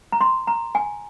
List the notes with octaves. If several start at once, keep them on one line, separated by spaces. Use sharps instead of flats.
A#5
C6
A#5
G#5